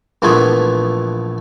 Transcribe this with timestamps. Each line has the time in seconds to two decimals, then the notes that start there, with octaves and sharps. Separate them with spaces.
0.22 A#1 E3 F3 A3 B3 G#4